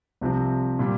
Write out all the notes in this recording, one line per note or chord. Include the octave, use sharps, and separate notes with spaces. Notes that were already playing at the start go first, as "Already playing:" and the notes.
C2 C3 F3 C4
A#2 G3